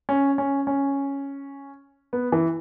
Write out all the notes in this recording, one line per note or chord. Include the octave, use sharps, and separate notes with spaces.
C#4
C#4
C#4
B3
E3